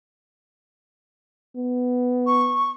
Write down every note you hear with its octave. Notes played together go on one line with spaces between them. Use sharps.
B3
C#6